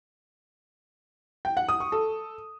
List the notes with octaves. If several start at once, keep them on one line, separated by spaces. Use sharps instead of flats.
G5
F#5
D#6
C#6
A4